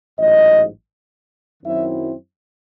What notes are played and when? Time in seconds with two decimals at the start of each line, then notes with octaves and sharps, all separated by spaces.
0.18 A1 G#2 F#3 D#5
1.62 F#2 D#3 F#3 C4 E4 E5